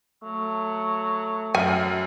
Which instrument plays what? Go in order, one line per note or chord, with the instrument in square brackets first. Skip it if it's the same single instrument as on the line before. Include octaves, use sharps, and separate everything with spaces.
[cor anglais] F#3 [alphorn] A3
[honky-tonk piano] F#2 F6 [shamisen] G#5